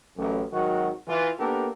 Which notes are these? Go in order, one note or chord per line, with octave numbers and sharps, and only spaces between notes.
A1 F#2
G#1 D#3 F#3 F#4
E3 F4
A#3 B3 D4 G4 A4 A#4